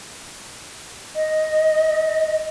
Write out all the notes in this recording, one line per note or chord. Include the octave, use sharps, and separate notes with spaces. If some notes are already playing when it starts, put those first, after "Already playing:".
D#5